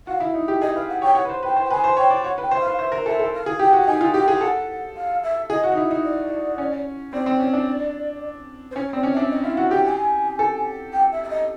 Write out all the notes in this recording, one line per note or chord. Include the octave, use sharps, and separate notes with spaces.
F#4 F5
E4
D#4
G4
G#4 D#5
B4 F5
F#5
C#5 G5
C#5 F#5
B4
C5
B4 G5
C5
G5
B4 G#5
C5
C#5 G5
D5
C#5 F#5
B4
G5
C5
E5
B4 F5
C5 E5
A#4
A4 E5
A4
F5
G#4
G4 G5
F#4
G5
D#4 G#5
F4
G4 G5
G#4
A4 F#5
F5
E5
G#4 D#5
F#4
D#4
E4
D#4
D5
C#4
C4 D5
C4
C#4
D4
C5
C#4 C#5
C4 D5
C#4
D4 E5
D#5
E4 F5
F#4
G4 G5
G#5
A4
G5
E5
E5
D#5